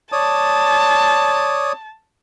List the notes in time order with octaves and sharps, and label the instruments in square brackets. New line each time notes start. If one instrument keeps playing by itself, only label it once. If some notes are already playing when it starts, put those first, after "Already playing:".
[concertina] C#5 D5 D#6 [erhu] A5